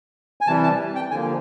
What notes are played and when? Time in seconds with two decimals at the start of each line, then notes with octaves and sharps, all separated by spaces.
0.41 G#5
0.47 C3 E3 G3 A5
0.63 A5
0.95 G5
1.10 D3 F3 A#3 G#5